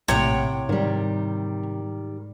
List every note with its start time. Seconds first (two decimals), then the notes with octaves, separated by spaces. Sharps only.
0.08 A#1 A2 C3 C#5 F#5 G5
0.69 G#2 D#3 G3